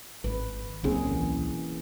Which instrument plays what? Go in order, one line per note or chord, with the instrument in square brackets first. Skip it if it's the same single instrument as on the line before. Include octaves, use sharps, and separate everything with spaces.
[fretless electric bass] G#1 [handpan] B4
[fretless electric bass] D1 B1 C4 [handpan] A#3 C#4 G#4
[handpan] E3